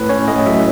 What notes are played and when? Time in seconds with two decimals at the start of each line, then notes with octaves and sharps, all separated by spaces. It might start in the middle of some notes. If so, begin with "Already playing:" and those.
Already playing: A2 B4
0.09 C#4 C#5
0.27 A2 D#5
0.46 F#3 E5